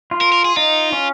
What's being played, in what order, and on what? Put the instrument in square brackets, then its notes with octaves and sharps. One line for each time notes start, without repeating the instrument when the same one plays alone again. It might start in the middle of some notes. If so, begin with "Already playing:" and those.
[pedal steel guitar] F4
[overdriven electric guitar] A#4
A#4
G#4
[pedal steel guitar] D#4 [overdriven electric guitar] F4
[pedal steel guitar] C#4